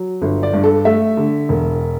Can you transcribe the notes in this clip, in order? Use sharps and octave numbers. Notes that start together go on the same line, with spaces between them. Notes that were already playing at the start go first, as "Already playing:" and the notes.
Already playing: F#3
G1
D5
G2
A4
A3 E5
D3
E1